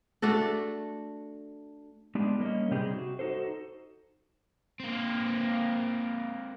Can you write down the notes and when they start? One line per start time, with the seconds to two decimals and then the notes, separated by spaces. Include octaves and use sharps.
0.22 A3 D4 F#4 A4
2.15 G#3 B3 D4 D#4 G4
2.40 G3 A#3 C#4 D#5
2.71 C3 G3 C4 D#4 G4 G#4
2.94 F#4
3.19 D#4 F#4 A4 C5
4.80 A#3 C4